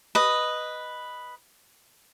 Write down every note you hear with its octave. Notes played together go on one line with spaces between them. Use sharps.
B4 D#5